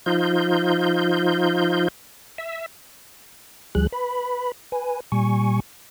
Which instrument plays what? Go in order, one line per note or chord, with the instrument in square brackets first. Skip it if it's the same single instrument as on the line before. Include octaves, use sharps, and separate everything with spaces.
[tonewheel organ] F3 D#4 F4 G6
E5
D2 F3 G3 G#4 F#6
B4 B5
B4 G#5
A#2 G3 G#5 C#6